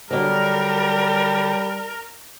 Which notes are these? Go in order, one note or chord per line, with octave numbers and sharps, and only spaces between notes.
D3 F#3 G3 A#4